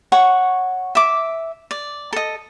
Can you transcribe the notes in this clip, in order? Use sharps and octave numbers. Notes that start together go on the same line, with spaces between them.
C#5 F#5 C#6
E5 D6
D5
A4 D#5